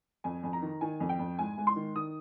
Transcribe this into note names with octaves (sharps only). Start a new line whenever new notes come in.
F2 G#5
F2
A#5
D#3
D#3 G#5
F2
G5
F2
G#2 G#5
G#2
C6
D#3
D#3 D#6